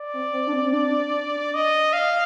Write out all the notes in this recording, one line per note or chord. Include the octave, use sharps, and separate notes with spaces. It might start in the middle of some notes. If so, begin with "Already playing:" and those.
Already playing: D5
C4
C4
D4
C4
C4
D4
D#5
F5